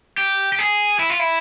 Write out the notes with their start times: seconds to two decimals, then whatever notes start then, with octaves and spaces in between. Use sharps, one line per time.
0.18 G4
0.53 G4
0.59 G#4
0.99 E4
1.10 F4
1.19 E4